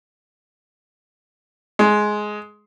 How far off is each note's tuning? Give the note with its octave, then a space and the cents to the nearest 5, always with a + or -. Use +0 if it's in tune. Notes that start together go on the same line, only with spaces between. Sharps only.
G#3 +10